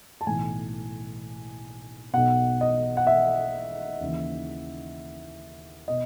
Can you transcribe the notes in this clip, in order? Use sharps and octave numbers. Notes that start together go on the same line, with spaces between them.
A5
B1 A2 E3 G#5
B1 B2 F#5
D#5
F#5
E5
D#2 C#3 E3
B2 D#5